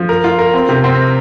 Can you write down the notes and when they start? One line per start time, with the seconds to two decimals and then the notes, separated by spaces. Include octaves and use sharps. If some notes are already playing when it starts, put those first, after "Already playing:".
Already playing: F3
0.09 A#4
0.24 F4
0.39 A#4
0.54 C4
0.69 C3
0.84 C4